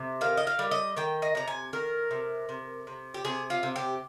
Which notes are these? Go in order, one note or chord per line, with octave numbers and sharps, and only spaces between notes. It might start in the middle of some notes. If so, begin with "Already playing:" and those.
Already playing: C3
D#3 F5
D#5
F5
G3
D#5
D#3 G5
D#5
C3 A#5
G#5
D#3 A#4
C3
C3
C3
G4
C3 G#4
F4
C3
G4